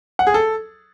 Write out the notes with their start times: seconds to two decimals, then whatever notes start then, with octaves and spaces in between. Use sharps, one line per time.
0.19 F#5
0.27 G#4
0.34 A4